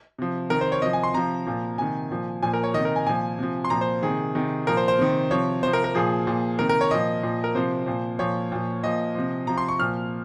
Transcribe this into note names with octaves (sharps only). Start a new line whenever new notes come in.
C3 F3
C3 D#3 A#4
C5
C#5
C3 F3 D#5
G#5
C6
C3 F3 A#5
A#2 F3
C3 D#3 G#5
A#2 F3
A#2 F3 G#5
A#4
C#5
C3 D#3 D#5
A#4
G#5
A#2 F3 G#5
C3 F3
C6
A#2 F3 A#5
C5
C3 D#3 G#4
C3 D#3
A#2 F3 A#4
C5
C5
C3 D#3
C3 F3 C#5
C3 F3 C5
A#4
A#4
A#2 F3 G#4
A#2 F3
C3 D#3 A#4
A#4
C#5
A#2 F3 D#5
A#2 F3
A#4
C3 F3 C5
A#2 F3
A#2 F3 C#5
A#2 F3
A#2 F3 D#5
C3 F3
C3 F3 A#5
C6
C#6
A#2 F3 F6